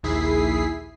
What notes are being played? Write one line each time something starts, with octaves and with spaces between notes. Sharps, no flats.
A#1 D#2 E4 G#4 B6 C7